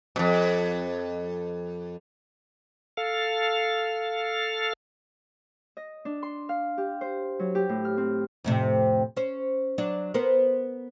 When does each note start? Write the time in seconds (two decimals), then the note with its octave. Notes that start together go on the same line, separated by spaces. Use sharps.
0.16 F2 B2
2.97 A4 F5
5.77 D#5
6.05 D4
6.23 C6
6.49 F5
6.78 G4
7.01 C5
7.39 F#3
7.55 G4
7.69 A2
7.85 F6
7.97 C4
8.44 F2 A2 C3
9.17 C#4 C5
9.78 F#3 D4
10.14 B3 A#4 C5